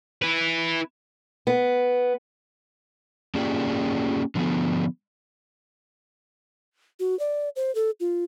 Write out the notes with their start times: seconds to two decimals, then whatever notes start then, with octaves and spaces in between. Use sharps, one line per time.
0.22 E4 B4
1.47 B3
3.35 A#3 C#4 F4 G4 G#4 D5
4.35 D3 F3 B3
7.00 F#4
7.19 D5
7.56 C5
7.75 A4
8.00 F4